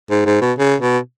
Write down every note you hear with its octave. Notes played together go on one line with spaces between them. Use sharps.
G#2
G#2
B2
C#3
B2